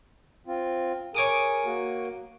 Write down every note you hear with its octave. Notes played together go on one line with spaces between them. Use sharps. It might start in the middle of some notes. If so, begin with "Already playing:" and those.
C4 F4
G#4 A#4 C#5 D6 D#6
A#3 F#4